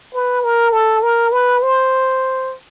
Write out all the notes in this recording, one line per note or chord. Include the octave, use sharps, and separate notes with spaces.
B4
A#4
A4
A#4
B4
C5